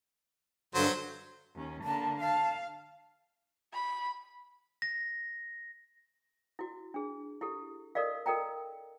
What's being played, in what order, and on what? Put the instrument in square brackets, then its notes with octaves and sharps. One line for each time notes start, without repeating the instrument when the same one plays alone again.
[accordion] G2 D3 [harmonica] F#3 C5
[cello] D#2 C#4
[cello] D3 A#3 [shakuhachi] A5
[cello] F5 [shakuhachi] A5
[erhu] B5
[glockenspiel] A#6
[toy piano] E4 F#4
D4 G#4
E4 G4 A4
A4 A#4 D5 D#5 F5
A4 A#4 D#5 G5 A#5